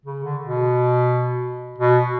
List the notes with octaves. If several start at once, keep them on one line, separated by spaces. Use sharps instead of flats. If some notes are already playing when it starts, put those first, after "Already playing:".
C#3
D3
B2
B2